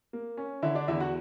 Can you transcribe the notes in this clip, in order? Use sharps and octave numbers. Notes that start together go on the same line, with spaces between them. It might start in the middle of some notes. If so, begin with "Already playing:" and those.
A#3
C#4
D3 E4 E5
D4 D5
E2 E4 E5
F#4 F#5